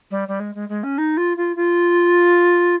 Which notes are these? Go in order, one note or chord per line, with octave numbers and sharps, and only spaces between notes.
G3
G3
G#3
G#3
G#3
C#4
D#4
F4
F4
F4